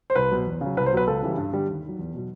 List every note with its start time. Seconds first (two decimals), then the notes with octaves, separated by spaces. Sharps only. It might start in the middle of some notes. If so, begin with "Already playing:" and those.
0.10 C5
0.15 C2 B4
0.31 B2 F#3
0.47 E2
0.61 C#3 F#3
0.77 C2 B4
0.86 C5
0.92 B2 F#3 B4
1.07 C#2 A4
1.22 C#3 E3 G3
1.37 G2
1.53 D3 G3
1.68 D#2
1.84 D#3 F#3
1.99 E2
2.14 B2 F#3